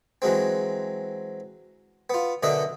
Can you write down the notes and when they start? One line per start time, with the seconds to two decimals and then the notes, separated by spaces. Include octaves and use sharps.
0.22 E3 F#3 G#3 C4
2.10 B3 F4
2.43 F#2 B2 D3 D4 D#5 E5